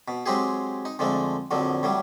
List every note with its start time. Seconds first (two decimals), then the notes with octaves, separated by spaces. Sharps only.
0.08 B2
0.26 F#3 G#3 C4 G4 G#4
0.85 D#4
0.99 F2 D3 G#3 A3
1.51 A#1 F2 D3 F#3
1.83 A2 F#3 G3